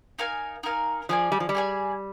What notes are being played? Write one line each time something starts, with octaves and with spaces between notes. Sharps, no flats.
D#4 A#4 F5 G#5
D#4 A#4 F5 G#5
F3 G#4 D5 G#5
G3
F3
G3
G#4 D5 G#5